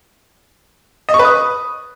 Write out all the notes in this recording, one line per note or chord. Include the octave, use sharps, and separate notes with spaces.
D#5
C#6
B4
D#6